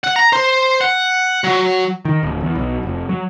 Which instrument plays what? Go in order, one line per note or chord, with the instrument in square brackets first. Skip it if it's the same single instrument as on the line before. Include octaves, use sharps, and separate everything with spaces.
[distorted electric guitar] F#5
A#5
C5
F#5
F#3
[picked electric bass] D#3
D1
E2
B1
F1
F#3